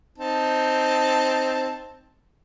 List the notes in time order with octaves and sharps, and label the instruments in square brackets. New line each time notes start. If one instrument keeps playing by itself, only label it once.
[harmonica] C4 D#4 A5